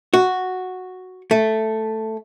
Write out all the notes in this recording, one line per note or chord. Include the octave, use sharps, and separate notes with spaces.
F#4
A3